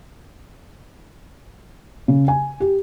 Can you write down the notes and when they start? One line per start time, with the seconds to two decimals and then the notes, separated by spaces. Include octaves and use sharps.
2.08 C#3
2.28 G#5
2.60 G4